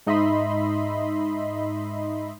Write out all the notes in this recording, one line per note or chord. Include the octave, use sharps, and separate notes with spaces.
G#2 D#4 D#5 E5 B5 C6